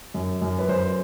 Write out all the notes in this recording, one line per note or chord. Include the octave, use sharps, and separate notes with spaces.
F#2
F#2
B4
F#2 C5